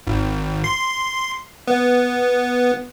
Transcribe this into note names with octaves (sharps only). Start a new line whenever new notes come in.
G#1
C6
B3